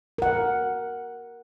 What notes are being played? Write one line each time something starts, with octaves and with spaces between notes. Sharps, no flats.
A#4 F#5